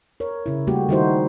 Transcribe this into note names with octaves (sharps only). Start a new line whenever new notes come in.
A#4 C#5
C#3 E4
G3 A3 A#3 F#4 G4
D#3 G3 D#4 E4 F#4 C5